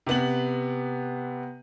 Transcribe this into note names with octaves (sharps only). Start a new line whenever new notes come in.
C3 B3 F#7